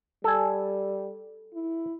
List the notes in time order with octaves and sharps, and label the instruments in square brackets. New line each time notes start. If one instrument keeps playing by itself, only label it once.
[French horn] G3 [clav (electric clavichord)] A4 G#5
[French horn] E4